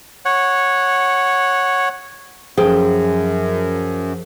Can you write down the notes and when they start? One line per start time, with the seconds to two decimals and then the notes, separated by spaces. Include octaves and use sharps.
0.25 C#5 F#5
2.57 F#2 F3 G#4 G5